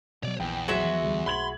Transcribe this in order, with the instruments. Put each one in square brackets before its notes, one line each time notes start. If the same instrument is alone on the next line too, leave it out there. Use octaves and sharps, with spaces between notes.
[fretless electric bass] B2 F#3 [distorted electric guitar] C#5 D5
[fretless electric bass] A#1 E3 [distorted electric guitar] E2 [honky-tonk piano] G5
[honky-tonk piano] F#3 [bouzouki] G#3 F#4 E5
[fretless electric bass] F3
D2 G3
[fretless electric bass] B1 [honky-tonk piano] B5 G#6 F#7 [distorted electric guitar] C6